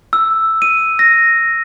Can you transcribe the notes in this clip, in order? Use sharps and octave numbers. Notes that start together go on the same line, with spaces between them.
E6
D#7
A#6